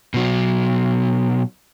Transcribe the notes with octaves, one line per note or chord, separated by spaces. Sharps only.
B2 F#3